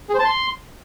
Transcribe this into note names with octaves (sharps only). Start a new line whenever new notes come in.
G#4
C5
A5
C6